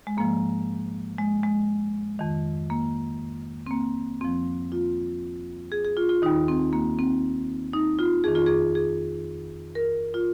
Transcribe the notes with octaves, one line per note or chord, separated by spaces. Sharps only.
G#3
G#2 F3 A#3
G#3
G#3
F2 D#3
A#3
C4
A#3
F2 F3 C4
F4
G#4
G#4
F4
F4
D#2 D#3 D#4
C4
A#3
C4
D#4
F4
F2 D#3 G#4
F4
G#4
G#4
A#4
F4